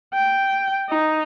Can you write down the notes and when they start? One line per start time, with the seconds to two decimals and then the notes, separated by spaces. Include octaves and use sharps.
0.14 G5
0.89 D#4